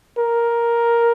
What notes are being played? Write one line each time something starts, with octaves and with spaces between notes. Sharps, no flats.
A#4